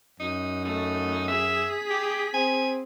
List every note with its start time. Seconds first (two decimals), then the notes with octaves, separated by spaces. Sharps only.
0.20 F#2 D#4
0.65 A3 D#4
1.28 G#4 E5 B6
1.90 G4
2.34 C4 G#5